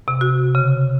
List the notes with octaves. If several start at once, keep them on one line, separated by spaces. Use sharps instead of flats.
C3
F#4
C#3